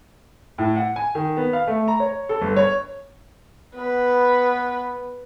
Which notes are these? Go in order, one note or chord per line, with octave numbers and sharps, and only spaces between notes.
A2
F#5
G#5
D#3
B3
F5
A3
A#5
C#5
A4
G1
C#5
B3 B4